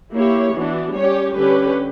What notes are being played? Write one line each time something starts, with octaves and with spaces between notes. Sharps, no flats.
A#3 E4 G4 C#5
E3 B3 D4 F#4
G3 C#4 G4 C#5
D3 G3 C#4 G4 B4